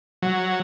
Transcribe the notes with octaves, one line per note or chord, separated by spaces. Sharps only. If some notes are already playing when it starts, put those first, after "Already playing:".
F#3